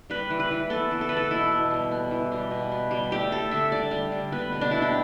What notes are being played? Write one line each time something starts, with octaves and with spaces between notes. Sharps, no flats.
G3 B4
E3
B4
E3
B3 A4
E3
A4
E3 B4
A4
B2 E4
B2
G3
B3
E3
G3
B2
B3
G3
A3 G4
A3 A4
D3 E5
G3 D5
G3
D3
B3 B4
B2
D4
B3 E4
G4